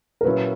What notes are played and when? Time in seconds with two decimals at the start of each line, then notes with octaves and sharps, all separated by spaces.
0.21 A#4
0.24 A#2 F#3 C#4 E4 B4